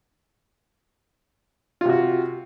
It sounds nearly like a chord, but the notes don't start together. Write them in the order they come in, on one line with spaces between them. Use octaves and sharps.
F4 C3 F#4